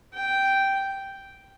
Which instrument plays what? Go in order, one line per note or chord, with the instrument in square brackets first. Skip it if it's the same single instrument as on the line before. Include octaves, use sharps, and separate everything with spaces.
[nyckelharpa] G5